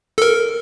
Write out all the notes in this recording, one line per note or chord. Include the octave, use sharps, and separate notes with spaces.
A4
A#4